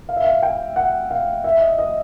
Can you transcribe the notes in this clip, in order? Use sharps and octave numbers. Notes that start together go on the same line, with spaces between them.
F5
E5
F5
G5
F#5
F5
E5
D#5
D#5